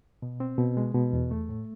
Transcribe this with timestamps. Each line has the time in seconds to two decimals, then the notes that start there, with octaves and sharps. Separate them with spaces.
0.22 B2
0.40 C4
0.58 B2
0.77 G#3
0.95 B2
1.13 E2
1.31 A3
1.49 A2